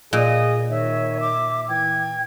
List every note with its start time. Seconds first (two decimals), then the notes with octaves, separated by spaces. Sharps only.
0.13 A#2 G#4 D#5
0.70 D#3 C#5 E5
1.20 D6
1.69 E3 G5 G#6